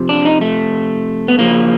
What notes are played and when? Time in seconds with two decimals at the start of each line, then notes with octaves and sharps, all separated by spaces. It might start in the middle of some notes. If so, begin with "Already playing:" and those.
Already playing: C3 F3
0.09 D4
0.25 D#4
0.41 A3
1.28 B3
1.38 C#3 F3 A#3